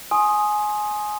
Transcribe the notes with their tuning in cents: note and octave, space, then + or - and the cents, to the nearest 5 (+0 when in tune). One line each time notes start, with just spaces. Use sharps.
G#5 +15 C6 +25 D#6 +0